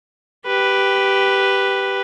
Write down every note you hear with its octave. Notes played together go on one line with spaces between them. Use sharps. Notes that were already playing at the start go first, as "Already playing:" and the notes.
G4 B4